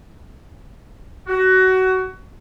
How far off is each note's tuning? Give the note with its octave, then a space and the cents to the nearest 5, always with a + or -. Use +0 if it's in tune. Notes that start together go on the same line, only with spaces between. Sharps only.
F#4 +20